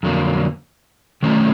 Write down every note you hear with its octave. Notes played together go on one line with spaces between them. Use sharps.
F2 D3 F#3 A#3
D#3 F#3 A3 C#4